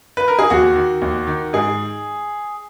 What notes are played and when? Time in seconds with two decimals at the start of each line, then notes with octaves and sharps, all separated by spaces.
0.17 B4
0.28 A#4
0.39 G#4
0.50 D#2 F#4
0.76 D#3
1.02 D#2
1.27 D#3
1.53 G#2 G#4